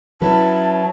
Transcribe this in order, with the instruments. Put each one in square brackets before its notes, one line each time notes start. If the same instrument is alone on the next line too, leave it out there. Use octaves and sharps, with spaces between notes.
[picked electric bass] F#3 [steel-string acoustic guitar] C#4 E4 B4 [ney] A5